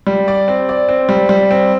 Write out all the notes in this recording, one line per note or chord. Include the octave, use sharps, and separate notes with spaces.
G3
D5
C4
D5
C4
G3
G3
C4